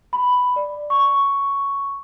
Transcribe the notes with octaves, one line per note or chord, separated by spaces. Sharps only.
B5
D5
C#6